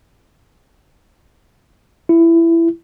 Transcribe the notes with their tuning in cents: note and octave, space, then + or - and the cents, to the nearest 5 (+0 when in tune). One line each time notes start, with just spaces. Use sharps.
E4 +15